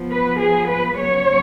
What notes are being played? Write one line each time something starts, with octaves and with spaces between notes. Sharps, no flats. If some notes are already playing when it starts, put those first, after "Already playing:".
Already playing: F3 B3
B4
G#4
B4
C#3 F#3 B3 C#5